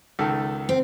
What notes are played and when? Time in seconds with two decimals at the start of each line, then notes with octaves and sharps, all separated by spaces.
0.19 C#2 D#3 A4
0.69 C4